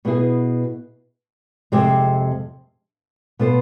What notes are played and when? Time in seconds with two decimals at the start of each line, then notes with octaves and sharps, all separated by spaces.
0.05 B2 B3 E4 G#4
1.72 F2 C3 G#3 C4 G#4
3.39 B2 B3 F4 A4 C5